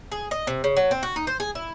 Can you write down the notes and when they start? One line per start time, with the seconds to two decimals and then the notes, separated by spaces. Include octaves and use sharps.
0.12 G#4
0.31 D#5
0.47 C3
0.64 C#3
0.77 F#3
0.91 C4
1.03 F#4
1.16 D#4
1.27 C5
1.40 G#4
1.55 E4